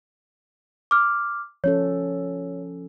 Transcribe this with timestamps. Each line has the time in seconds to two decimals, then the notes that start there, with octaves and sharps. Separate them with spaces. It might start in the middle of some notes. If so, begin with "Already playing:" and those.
0.91 D6 F6
1.64 F3 C#4 A4 C#5